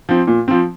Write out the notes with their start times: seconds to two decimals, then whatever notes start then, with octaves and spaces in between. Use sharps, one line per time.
0.09 F3 C4
0.27 A#2
0.48 F3 C4